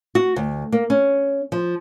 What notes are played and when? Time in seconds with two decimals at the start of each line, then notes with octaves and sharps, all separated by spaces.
0.15 F#4
0.36 D2
0.72 A#3
0.90 C#4
1.52 F3